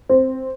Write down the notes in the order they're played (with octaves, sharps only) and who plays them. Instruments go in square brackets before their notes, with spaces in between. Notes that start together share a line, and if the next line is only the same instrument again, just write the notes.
[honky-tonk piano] C4